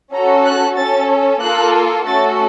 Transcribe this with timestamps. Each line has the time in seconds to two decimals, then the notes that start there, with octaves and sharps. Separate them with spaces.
0.13 C#4 F#4 A4 A#5
0.46 F#6
0.77 C#4 A4 A6
1.42 A#3 F4 A4 F#6
2.06 A3 C#4 F#4 A4 A6